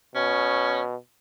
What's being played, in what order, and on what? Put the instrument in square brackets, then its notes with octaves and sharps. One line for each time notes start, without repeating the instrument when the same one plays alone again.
[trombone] B2 [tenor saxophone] C#4